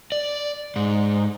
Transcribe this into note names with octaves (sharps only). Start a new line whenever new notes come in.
D5
G#2